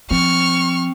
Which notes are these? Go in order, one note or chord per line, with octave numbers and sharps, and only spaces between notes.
F3 C4 C#6 F6